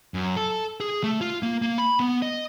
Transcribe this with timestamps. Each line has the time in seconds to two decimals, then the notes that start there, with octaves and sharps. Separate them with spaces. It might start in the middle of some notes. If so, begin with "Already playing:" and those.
0.14 F#2
0.37 A4
0.80 G#4
1.03 A3
1.21 F4
1.43 A#3
1.62 A#3
1.78 B5
2.00 B3
2.22 D#5